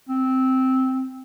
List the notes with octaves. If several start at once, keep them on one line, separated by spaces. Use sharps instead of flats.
C4